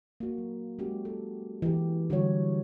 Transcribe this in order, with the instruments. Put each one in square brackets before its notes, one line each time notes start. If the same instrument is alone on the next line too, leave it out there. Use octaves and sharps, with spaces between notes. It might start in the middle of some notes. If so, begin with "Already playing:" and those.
[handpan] A#3 F#4
F#3
G#3 C#4 F#4 G4
A4
E3 G4
D3 E3 G3 F#4 C#5